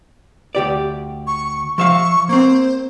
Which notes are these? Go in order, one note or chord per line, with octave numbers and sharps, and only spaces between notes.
D2 G4 D5
C#6
F3 E5 F5 C#6
A#3 C4 C5